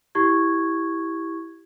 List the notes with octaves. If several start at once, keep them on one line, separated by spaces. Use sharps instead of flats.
E4 G4 C#6 G#6